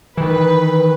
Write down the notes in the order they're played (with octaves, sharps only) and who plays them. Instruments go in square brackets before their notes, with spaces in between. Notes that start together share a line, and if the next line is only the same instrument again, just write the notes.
[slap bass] D#3 E3 [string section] B4